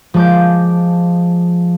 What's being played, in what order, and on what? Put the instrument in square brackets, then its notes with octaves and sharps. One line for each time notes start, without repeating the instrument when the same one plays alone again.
[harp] F3 G#3 A5 D6 G6